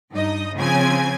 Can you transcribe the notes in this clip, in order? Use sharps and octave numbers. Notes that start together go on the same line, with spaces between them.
G2 D#4 D#5
C#3 F3 C4 G#5 G#6